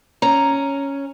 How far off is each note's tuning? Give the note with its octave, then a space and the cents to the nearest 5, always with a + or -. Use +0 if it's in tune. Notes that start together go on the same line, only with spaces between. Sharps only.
C#4 +0 A#5 +0